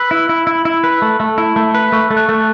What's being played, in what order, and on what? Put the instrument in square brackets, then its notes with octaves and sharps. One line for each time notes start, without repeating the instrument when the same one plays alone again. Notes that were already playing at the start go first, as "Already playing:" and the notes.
Already playing: [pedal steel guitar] B4 [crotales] E6
[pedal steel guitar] E4
E4
E4
E4
B4
A3
A3
E4
A3
B4
[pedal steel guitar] A3 [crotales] C#6
[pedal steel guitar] A3
[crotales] F#6
[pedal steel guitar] A3